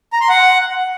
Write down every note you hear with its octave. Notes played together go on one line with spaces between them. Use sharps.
A#5
C6
F#5